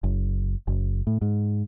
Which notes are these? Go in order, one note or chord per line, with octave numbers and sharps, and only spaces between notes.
F#1
F#1
A2
G#2